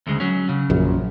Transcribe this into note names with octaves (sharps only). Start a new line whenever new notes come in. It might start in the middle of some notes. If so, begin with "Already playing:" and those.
D2 C#3 G#3
F#3 C#4
C#3
A#1 F#2